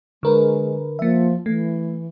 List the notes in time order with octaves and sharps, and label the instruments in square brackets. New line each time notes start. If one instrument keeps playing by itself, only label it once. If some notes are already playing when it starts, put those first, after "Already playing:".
[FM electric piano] D3 A#4 B4 [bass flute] G#3
[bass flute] F3 [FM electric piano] A#3 E5
[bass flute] E3 [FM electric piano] A3